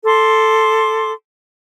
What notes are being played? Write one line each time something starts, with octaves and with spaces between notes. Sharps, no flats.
A4 C6 D6